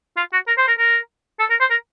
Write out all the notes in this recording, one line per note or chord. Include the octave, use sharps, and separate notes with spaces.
F4
F#4
A#4
C5
A#4
A#4
A4
A#4
C5
A#4